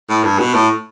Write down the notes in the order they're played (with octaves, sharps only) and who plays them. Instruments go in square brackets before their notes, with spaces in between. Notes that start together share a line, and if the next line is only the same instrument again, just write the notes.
[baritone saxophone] A2
G2
B2
A2